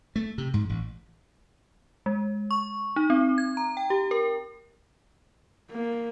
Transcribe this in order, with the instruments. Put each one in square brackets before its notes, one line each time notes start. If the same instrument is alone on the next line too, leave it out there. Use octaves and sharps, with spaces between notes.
[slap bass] A3
C3
G#2
A1
[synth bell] G#3
C#6
D#4
C4
G#6
A#5
G5
G4
A#4
[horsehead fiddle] A#3